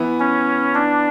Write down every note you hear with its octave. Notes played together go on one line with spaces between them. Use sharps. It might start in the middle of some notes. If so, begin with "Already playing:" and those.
Already playing: E3 B3 E4
C#4
D4